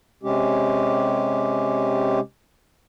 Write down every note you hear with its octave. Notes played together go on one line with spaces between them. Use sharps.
C3 G#3 C#4 G4